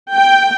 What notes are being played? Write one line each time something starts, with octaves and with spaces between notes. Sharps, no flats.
G5